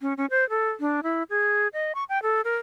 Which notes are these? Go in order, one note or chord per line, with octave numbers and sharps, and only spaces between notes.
C#4
C#4
C5
A4
D4
E4
G#4
D#5
C#6
G5
A4
A#4